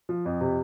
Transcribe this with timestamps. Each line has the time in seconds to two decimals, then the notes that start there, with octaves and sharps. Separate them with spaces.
0.09 F3
0.25 F2
0.41 C3